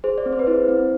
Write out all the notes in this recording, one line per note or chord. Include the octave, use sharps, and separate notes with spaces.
G#4 C5
D5
C4
C5
B4
E4 C5
C4